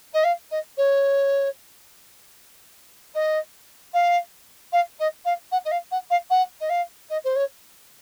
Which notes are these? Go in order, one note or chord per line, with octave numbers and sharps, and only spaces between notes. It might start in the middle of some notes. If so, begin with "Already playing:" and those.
D#5
F5
D#5
C#5
D#5
F5
F5
D#5
F5
F#5
D#5
F5
F#5
F5
F#5
D#5
F5
D#5
C5
C#5